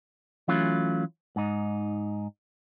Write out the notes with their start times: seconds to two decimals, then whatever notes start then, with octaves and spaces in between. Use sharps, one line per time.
0.48 E3 F#3 A3 C#4 F4
1.36 G#2 D#4